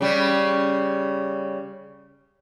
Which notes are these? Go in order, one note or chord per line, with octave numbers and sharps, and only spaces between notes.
C#3 G3